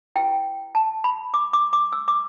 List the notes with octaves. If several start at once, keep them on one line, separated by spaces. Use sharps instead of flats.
E4 G4 B4 G5
A5
B5
D6
D6
D6
E6
D6